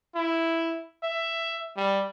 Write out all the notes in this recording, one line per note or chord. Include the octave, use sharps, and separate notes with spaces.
E4
E5
G3